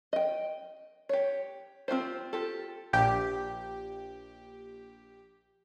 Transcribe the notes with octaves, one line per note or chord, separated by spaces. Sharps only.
D#5 G5
G4 C#5
C4 F4 G4 C5
F4 G4 A4
A#1 G4